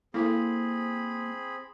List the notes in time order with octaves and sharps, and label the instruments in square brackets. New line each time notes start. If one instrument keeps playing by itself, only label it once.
[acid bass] A#3 [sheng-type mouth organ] C4 G#4 B5 [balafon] E4 A4 C6